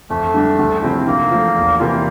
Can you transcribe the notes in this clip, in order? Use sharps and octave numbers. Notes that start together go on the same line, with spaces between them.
F2 A3
D3 G3 D4
D2
C3 F3 C4 E4
D3 A#3
F3 A3
E2
C3 E3 A#3 F4